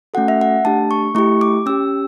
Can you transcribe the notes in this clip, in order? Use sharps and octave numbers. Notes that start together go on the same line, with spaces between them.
A3 C#4 F#4 A4 F#5
E5
F#5
A3 D4 G4 A5
C#6
A3 E4 G4 C#6
D6
C#4 G4 E6